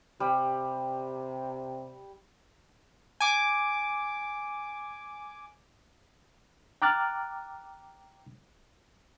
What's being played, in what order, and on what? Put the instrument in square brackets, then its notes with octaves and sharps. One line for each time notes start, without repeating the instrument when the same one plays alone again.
[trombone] C3 [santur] G3
[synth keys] G#5 D6
[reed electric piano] G5 A#5 D6 F6 F#6 A6